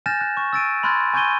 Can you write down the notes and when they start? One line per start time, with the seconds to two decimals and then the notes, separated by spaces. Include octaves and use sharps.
0.06 G#5 F6 G6 A6 A#6 E7
0.21 F#6
0.37 C#6
0.53 E6 A6 D7 D#7
0.83 B5 C6 F6 F#6 G#6 A6
1.13 G#5 C#6 G6 G#6 D#7 G7